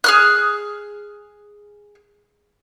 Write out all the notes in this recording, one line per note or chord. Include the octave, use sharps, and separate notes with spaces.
G#4 F6 F#6